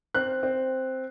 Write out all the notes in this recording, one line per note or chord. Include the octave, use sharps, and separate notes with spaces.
C4 F#6
C4